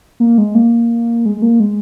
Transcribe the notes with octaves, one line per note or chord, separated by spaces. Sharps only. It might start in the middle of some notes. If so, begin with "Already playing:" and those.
A#3
G#3
A#3
G#3
G#3
A#3
G#3